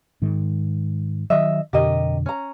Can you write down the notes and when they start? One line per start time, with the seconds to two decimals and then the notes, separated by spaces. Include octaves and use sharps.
0.22 G#2 D#3 G#3
1.30 D#3 F#3 D#5 E5
1.73 F2 B2 D3 G4 A#4 D#5
2.26 C#4 A#5